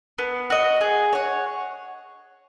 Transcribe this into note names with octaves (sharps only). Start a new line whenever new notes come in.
B3
F#4 D#5
G#4
C#5 F#5